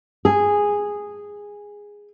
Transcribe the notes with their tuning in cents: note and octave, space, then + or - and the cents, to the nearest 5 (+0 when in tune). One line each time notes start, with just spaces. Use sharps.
G#4 -10